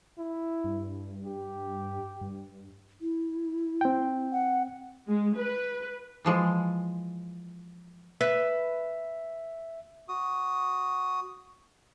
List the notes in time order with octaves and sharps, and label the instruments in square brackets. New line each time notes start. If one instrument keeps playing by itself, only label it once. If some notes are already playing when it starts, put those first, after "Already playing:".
[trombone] E4
[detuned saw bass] G2
[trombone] G4
[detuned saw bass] G2
[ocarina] E4
[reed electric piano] C4 G5
[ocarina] F#5
[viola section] G#3
B4
[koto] E3 F3 G#3
[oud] B4 [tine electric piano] E5
[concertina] F#4 D#6